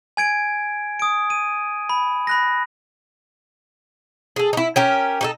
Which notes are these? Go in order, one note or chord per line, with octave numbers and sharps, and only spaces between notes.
G#5 G#6 D7
D#6 D7
D#7
B5
B5 F#6 A#6
G#4 A4
D#4 E4
C#4 G4 A#4
D#4 G4 A4